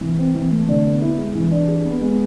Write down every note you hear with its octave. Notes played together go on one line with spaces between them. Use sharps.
E3
C4
E3
A3
D3
B3
E4
G#3
E3
D4
G#4
B3
G#3